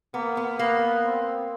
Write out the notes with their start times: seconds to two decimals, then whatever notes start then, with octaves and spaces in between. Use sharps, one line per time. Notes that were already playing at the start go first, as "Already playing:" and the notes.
0.14 A#3 B3
0.37 B3
0.59 A#3 B3
1.06 C4